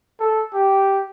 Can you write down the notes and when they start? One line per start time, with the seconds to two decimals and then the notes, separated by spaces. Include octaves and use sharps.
0.20 A4
0.54 G4